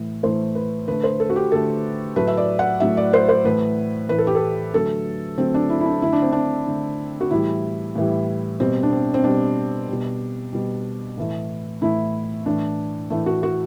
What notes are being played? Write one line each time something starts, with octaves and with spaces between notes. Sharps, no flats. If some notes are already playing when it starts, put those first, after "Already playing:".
Already playing: A2 E3 A3
A2 E3 A3 C5
B4
D3 A3 B4
C5
A4
F#4
G4
D3 A3 A4
A2 F#3 A3 B4
E5
D5
F#5
A2 F#3 A3 E5
D5
C5
C5
A2 E3 A3 B4
A2 E3 A3 B4
A4
G4
A4
D3 F#3 A3 A4
D3 F#3 A3 C4
D4
E4
E4
D4
D3 A3 E4
D4
C4
D4
D3 A3
F#4
A2 E3 G3 E4
A2 E3 G3
B2 G3 C4
D4
C4
C4
B2 G3 D4
B2 G3
B2 G3
A2 E3 A3
A2 E3 A3 E4
A2 E3 A3 D4
A2 E3 A3
F#4
F#4